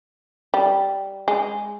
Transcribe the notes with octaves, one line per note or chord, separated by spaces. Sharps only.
G3
G#3